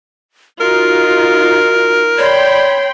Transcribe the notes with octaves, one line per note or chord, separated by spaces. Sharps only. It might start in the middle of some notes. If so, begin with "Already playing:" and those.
D#4 F4 F#4 A#4
C#5 D5 G5 B5 C6